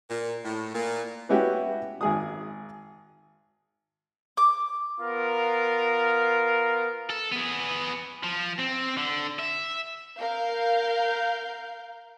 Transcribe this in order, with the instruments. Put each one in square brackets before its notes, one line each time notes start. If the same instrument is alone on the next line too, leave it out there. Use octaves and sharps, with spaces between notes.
[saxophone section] A#2
A2
A#2
[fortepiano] B3 C#4 E4 F#4 G4
G#1 G#4 D#6
[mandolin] D6
[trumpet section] B3 F4 A#4
[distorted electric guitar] A4
B3 G#4
F3
C4
D3
E5
[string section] A#4 F5 G6